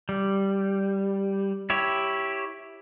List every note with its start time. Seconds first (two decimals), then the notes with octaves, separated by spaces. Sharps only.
0.09 G3
1.70 E4 G4 C#5